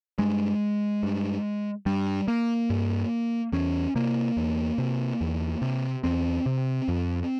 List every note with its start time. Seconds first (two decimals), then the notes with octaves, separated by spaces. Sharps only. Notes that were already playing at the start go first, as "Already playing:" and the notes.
0.18 G2 G#3
1.03 G2
1.86 G2 G3
2.28 A#3
2.70 G2
3.53 E2 C#4
3.95 C3 A#3
4.37 E2
4.78 C3
5.21 E2
5.62 C3
6.04 E2 C4
6.46 C3
6.88 F2